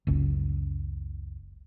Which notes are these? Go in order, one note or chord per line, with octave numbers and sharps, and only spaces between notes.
F#1 C#2